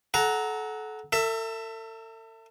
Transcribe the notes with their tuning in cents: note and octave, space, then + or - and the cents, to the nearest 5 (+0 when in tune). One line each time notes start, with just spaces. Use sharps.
A4 -30 F#5 +0 A#5 +0
A4 +40 E5 +5